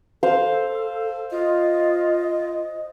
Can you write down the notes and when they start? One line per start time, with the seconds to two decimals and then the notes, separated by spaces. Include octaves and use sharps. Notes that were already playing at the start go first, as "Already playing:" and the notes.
0.23 A4 C5 F5
1.32 F4 D#5